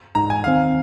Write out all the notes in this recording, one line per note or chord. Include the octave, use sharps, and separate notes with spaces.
G#2 G#3 D#4 A#5
G#5
D#2 D#3 C4 F5